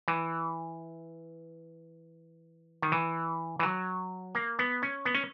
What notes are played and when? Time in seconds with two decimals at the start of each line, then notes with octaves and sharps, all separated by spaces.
0.08 E3
2.83 D#3
2.92 E3
3.59 E3
3.63 F#3
4.35 A#3
4.59 B3
4.83 C#4
5.05 B3
5.15 C#4